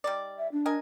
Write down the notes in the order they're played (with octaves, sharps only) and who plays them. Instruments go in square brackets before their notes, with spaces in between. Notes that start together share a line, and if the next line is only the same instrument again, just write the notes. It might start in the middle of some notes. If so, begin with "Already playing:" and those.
[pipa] G3 D#4 D5
[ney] E5
D4
[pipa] A#4 D#5 G#5